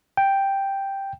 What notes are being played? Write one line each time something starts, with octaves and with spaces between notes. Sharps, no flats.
G5